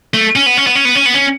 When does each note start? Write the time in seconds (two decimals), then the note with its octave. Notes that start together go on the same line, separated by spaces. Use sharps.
0.14 A3
0.36 C#4
0.46 B3
0.57 C#4
0.67 B3
0.75 C#4
0.85 B3
0.95 C#4
1.06 B3
1.14 C#4